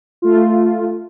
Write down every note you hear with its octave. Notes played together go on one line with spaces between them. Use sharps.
A3 F4